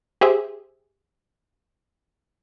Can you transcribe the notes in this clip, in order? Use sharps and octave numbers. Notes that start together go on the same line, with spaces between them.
G4 G#4 C5 E5